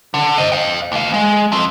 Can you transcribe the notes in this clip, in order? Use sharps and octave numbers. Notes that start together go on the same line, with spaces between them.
D3
C5 D#5
F5 G5
D#2 F5
G#3
F3 C4